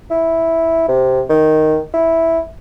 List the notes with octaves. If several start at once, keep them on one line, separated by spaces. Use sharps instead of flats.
E4
C3
D#3
E4